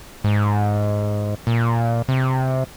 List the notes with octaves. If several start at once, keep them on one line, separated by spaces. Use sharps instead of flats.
G#2
A#2
C3